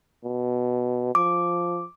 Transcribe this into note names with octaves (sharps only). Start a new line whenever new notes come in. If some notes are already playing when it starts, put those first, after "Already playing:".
B2
F3 D6